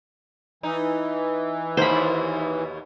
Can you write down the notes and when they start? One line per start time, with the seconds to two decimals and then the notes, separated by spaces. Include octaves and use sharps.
0.63 E3 D#4
1.77 D#2 B2 A#3 C5 B5